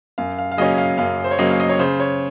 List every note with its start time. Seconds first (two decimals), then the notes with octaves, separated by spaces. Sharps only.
0.18 F#2 F5
0.39 F5
0.52 F5
0.57 C#3 F#3 A#3 C#4 D#5
0.78 F5
0.98 F#2 F5
1.24 C5
1.31 C#5
1.39 C#3 F#3 A#3 C#4 D#5
1.51 F5
1.60 D#5
1.69 C#5
1.79 C#3 C5
2.00 C#5